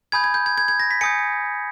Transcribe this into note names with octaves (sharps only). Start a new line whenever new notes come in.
G#5 B5 D#6 G6 G#6
G#6
G6
G#6
G#6
G#6
A#6
B6
G#5 D#6 G6 C#7